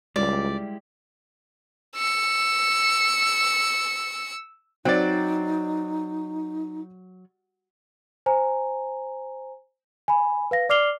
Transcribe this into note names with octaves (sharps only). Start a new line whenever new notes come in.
C#2 G3 G#3 E4 G4 D5
E6 C#7
F#3 C4 D#4 D5
C5 G#5 A#5
G#5 B5
B4 F5 A#6
D5 D6 F6 C7 F7 G7